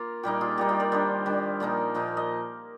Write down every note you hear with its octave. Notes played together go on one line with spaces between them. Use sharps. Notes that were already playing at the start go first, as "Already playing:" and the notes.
Already playing: A#3 F4
A#2 G3 A#3 D#4 G4
F4 G#4
A#2 G3 A#3 D#4 G4
F4
A#4 D5
D#3 G3 D4 C5 D#5
D#3 G3 D4
A#2 F3 A#3 D#4 D5 F5
A#2 F3 A#3 D#4
D#5